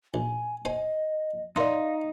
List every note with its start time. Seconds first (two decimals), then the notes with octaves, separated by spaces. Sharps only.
0.14 A#1 G#5
0.65 C5 D#5 G#5
1.56 D#4 A#4 D5 E5 F5 C6